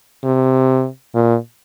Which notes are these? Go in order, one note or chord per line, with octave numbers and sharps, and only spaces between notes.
C3
A#2